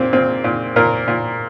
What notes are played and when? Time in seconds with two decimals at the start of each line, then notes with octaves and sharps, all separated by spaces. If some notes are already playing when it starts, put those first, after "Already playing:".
Already playing: A#2 A#3 C4
0.13 A#2 C4
0.44 A#2
0.76 A#2 A#4
1.08 A#2